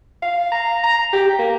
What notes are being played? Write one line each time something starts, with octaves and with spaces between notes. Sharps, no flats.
F5
A#5
A#5
G4
A#3